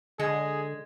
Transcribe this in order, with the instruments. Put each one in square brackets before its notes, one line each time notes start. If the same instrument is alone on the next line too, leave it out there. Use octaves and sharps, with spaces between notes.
[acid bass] D3 [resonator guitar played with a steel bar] G#3 [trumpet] G#4